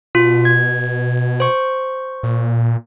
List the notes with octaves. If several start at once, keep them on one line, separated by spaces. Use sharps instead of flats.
B2 F4
G#6
C5 C#6
A#2